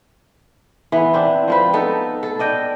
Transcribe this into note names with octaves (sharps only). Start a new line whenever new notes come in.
E3 B3
C4 D4
F3 C4 B4
B3 D#4 A4
A4
D4 D#5 G5